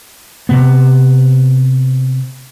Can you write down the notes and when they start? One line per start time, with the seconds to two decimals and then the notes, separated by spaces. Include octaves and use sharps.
0.49 C3 B3